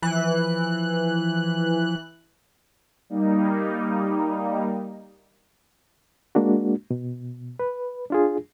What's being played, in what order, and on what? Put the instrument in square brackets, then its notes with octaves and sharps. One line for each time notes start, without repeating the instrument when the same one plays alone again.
[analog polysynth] E3 F#6 [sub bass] F3
[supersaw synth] G3 A#3 D#4
[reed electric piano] G#3 A#3 D4 F#4
B2
B4
D4 F4 G#4